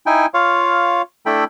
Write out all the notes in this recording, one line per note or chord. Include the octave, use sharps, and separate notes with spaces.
D#4 E4 G5 G#5
F4 C#5 F5
A3 D4 E4 A4 G5 B5